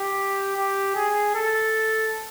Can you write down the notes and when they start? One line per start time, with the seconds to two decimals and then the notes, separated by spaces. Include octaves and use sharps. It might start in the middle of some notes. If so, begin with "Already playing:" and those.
Already playing: G4
0.56 G4
0.95 G#4
1.35 A4